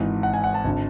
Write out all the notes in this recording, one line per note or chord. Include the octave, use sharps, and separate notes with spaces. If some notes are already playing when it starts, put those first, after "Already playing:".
Already playing: G#1 G#2 E3
F#5
G#5
F#5
A5
G#1 D3